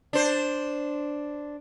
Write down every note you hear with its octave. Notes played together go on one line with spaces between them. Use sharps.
D4 C5